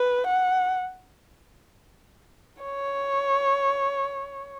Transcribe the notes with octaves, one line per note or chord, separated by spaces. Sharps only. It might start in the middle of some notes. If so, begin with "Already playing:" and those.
Already playing: B4
F#5
C#5